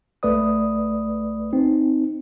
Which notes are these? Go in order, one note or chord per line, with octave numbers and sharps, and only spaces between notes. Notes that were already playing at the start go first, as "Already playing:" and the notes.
B1 A3 B4 D5 D#6
C4 D#4